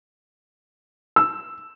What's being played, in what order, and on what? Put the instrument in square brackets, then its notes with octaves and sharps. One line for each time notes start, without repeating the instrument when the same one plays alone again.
[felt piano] E6